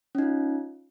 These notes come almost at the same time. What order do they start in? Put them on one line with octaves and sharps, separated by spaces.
C#4 D#4 F4